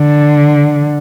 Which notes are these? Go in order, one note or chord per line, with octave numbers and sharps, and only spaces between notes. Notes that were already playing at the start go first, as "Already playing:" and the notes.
Already playing: D3